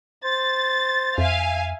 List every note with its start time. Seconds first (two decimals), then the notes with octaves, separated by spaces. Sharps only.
0.24 C5 A6
1.18 F2 E5 F5 G#5